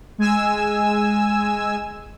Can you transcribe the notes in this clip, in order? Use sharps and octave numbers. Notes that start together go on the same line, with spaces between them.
G#3 G#5 E6